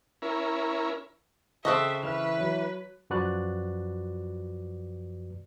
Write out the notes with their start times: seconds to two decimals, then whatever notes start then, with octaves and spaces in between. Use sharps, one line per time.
0.22 C#4 E4 A#4
1.65 C#3 C4 A4 D#5 E5 C#6 F#6
2.03 E3 B4 E5 F6
2.38 F#3 C#5
3.10 F#2 F3 F#4 B4 D5 F#6